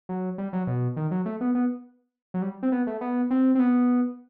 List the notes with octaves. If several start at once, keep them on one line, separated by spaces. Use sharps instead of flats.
F#3
G3
F#3
B2
D#3
F#3
A3
B3
B3
F#3
G3
C4
B3
A3
B3
C4
C4
B3